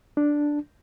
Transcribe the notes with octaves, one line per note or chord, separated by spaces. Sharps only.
D4